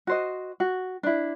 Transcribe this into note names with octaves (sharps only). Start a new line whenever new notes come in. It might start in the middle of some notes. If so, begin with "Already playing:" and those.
F#4 C5 D#5
F#4
D4 E4